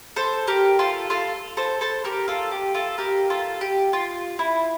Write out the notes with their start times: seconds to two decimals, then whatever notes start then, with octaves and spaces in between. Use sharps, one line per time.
0.16 A4 C5
0.47 G4 A#4
0.79 F4 A4
1.10 F4 A4
1.57 A4 C5
1.81 A4 C5
2.04 G4 A#4
2.28 F4 A4
2.51 G4
2.75 F4 A4
2.98 G4 A#4
3.30 F4 A4
3.61 G4
3.93 F4
4.39 E4